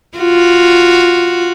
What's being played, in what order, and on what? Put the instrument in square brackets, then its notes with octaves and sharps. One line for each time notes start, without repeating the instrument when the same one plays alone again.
[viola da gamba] F4 F#4